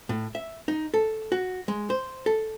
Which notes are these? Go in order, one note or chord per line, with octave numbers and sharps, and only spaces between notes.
A2
E5
D#4
A4
F#4
G#3
C5
A4